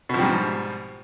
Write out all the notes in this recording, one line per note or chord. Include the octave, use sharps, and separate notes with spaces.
G#2 B2 F3 G3